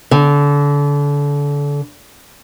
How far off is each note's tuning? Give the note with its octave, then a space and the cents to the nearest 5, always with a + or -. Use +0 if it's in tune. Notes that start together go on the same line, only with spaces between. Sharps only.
D3 -30